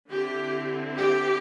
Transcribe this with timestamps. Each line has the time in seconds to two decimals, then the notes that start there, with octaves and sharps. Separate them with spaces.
0.10 D3 C4 E4 G4
0.96 G4